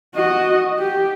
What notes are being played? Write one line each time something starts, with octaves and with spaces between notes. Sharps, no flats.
F#4 D#5
G4